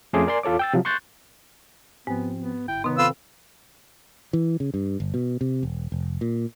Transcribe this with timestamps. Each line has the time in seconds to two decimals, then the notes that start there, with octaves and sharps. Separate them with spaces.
0.13 F2 A3 C#4 G#4 C6 D6
0.27 A#4 D5 G#5 C6
0.43 E2 F4 A4 C#5 D6
0.59 G5 E6 A6
0.73 C3 F3 F#3
0.85 C6 C#6 F#6 G6 A6
2.07 G#2 F3 B3 C4
2.39 B3
2.68 G1 E4 G5
2.84 C3 D#3 B3 D#4
2.98 C4 F4 A4 B4 E6
4.33 E3
4.60 C#3
4.74 G2
5.00 G1
5.14 B2
5.41 C3
5.63 E1
5.92 F1
6.21 A#2